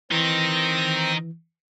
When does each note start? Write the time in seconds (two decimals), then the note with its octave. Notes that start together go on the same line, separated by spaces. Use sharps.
0.11 D#3 E3 C4 D#4 A#5 A#6